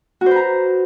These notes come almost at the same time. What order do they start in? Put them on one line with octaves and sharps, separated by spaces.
F#4 C5 B4 A#5